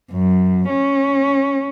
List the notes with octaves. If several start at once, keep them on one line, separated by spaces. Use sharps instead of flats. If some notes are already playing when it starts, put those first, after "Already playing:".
F#2
C#4